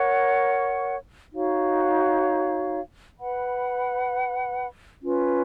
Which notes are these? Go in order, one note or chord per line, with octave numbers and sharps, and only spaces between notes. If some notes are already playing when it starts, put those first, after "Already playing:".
Already playing: A#4 C#5 F#5 C#6
D#4 F#4 C#5 F5
B4 F#5 B5
C#4 F4 B4